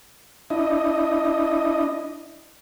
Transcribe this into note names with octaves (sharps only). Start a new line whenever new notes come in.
D4 E4 D#5